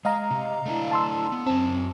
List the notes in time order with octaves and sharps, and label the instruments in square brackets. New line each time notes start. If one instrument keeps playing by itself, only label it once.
[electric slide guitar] G#3 [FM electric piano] D#5 F5 A#5
[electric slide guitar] C3
A3 D4 E4
[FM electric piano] A5 C6 E6
[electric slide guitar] B3
[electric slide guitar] F#2 A5 [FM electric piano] C4